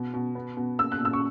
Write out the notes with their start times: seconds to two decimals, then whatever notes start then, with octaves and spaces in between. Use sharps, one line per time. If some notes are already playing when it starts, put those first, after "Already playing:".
Already playing: B2
0.14 B2
0.35 B3
0.57 B2
0.79 A#3 E6
0.92 F#6
1.01 A#2 E6
1.13 C#6